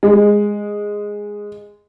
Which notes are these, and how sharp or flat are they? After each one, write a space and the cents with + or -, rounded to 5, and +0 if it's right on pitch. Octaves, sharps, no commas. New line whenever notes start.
G#3 -5